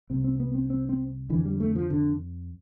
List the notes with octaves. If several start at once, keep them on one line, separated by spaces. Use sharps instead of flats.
C2 C3 C4
C4
B3
C4
C4
C4
F2 D3 E3
G3
A3
F3
D3